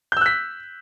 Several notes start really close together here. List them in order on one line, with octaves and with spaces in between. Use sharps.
G6 E6 F#6 B6